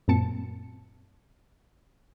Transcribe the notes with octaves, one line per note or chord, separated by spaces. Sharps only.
F#2 A#2 C4 A5 C#7